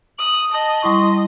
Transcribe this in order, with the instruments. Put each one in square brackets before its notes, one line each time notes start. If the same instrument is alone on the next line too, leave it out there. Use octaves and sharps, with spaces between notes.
[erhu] D#6 [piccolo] F#7
[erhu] D#5 [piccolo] A5
[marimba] G3 E4 C#6 [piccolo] C6